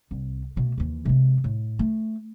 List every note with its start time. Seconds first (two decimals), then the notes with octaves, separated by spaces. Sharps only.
0.11 C2
0.56 B2 A3
0.78 D#2 E3
1.05 C3 G#3
1.44 A2
1.79 A3